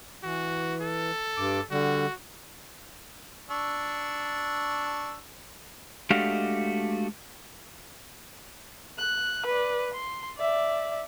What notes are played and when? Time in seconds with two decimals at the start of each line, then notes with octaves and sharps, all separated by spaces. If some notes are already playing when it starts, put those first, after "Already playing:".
0.24 E3 F#4
0.81 A4
1.37 G2 D6
1.71 D3 G3 F#4
3.51 D4 C#6 E6
6.10 G#3 A3 D4 F#4 G4 F5
8.98 F#6
9.46 B4 D5
9.94 C6
10.37 D5 E5